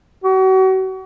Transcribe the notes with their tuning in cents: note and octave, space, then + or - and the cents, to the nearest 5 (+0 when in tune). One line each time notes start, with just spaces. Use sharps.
F#4 +35